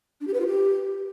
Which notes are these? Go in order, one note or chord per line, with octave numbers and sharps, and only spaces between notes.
D4
G4
B4
F4
G4